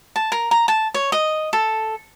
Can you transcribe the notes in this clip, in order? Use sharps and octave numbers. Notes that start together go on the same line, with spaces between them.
A5
A#4
A#5
A5
C#5
D#5
A4